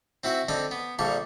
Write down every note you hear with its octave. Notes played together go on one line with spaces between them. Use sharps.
C4 E4 F#4 E5
D3 C4 D#5 B5
B3
A#1 D3 G3 A#3 C#6